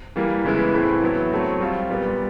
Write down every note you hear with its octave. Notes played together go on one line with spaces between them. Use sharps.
E3 G3 A#3
C#3 E3 G#3 B3 E4
A2 E3 A3 C4
F#3 B3 E4
F#3 A3 C4
G3 C4 F4
A#2 G3 B3